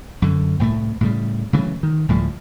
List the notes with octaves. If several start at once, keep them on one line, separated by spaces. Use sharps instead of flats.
F#2 D3
C2 A2 G3 A3
A2 C#3 G3
C#3 E3 F#3 A3
D#3
D2 A2 F3 G3